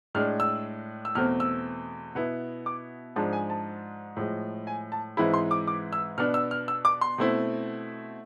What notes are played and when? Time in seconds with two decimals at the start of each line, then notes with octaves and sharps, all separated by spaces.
0.15 A2 G#3 D4 F6
0.40 E6
1.05 E6
1.15 E2 B2 A3 C4 F6
1.40 E6
2.15 B2 B3 E4
2.66 D6
3.16 G#2 F3 G#3 D4 A5
3.33 G#5
3.50 A5
4.17 A2 F3 G#3
4.67 G#5
4.92 A5
5.17 G#2 E3 G#3 C4 E4 B5
5.34 C6
5.51 D6
5.67 D6
5.93 E6
6.18 B2 B3 D4 F6
6.34 E6
6.51 F6
6.68 E6
6.85 D6
7.01 C6
7.18 B2 A3 C4 E4